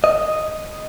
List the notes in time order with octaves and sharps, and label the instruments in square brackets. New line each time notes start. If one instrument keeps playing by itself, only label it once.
[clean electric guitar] D#5